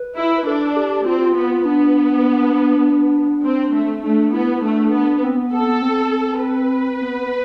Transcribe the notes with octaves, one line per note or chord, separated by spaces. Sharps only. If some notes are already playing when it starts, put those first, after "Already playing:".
Already playing: B4
E4
B4
D4 A4
G4
C4 F4
F4
B3 F4
F4
B3 D4
C4
A3
A3 D4
B3 E4
E4
A3 D4
B3
C4
B3
B3 A4
B3
C4
B4
B3
B3